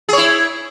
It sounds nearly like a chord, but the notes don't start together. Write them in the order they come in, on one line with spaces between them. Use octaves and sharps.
G#4 C#5 E4